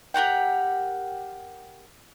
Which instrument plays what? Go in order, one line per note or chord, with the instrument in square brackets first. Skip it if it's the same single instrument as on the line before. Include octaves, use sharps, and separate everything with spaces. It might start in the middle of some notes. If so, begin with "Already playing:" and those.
[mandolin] G4 A#4 F#5 G5